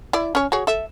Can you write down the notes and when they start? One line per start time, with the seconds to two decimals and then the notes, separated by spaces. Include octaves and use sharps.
0.13 E4 D5
0.35 C#4 C#5
0.52 F#4 G#4 C#5
0.67 A4 E5